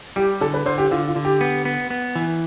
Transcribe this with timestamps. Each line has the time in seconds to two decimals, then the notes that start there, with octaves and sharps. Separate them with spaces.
0.16 G3 G4
0.41 D3 A4
0.54 B4
0.66 D3 C5
0.78 G4
0.91 D3 F4
1.08 F4
1.16 D3
1.25 G4
1.41 B3
1.65 B3
1.90 B3
2.15 E3